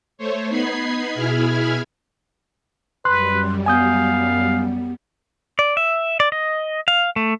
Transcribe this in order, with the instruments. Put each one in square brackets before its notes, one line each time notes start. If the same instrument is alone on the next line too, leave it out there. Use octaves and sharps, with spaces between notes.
[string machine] A3 C5 C#5
B3 D#4 B5 G#6 C7
B2 E4 G#4 B5 F6 G#6
[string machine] F#2 G3 [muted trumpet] B4 [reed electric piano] C6 F#6
[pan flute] B3 [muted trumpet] F5 [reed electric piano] G#5 D#6 G6
[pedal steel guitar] D5
E5
D5
D#5
F5
A3